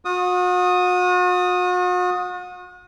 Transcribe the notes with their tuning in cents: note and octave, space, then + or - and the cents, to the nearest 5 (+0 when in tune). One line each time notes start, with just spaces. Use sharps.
F#4 -40 D#6 +0